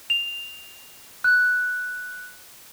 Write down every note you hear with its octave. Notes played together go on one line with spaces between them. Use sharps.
F7
F#6